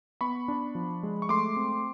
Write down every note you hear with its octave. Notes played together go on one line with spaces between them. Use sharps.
B3 B5 C#6
D4
F3
G#3
C#6
A3 C6 D6
C4